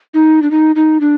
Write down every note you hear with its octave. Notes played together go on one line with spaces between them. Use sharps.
D#4
D4
D#4
D#4
D4